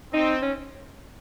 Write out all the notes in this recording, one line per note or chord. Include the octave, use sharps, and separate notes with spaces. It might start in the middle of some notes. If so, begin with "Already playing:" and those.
C4 D#4
C#4